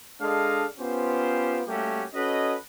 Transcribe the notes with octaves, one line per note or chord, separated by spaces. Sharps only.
G#3 D4 A4 D#5 F5
B3 C#4 F4 G4 C5
G3 A3 A#3 C#4 F#4 G4
C#4 F#4 A4 B4 D#5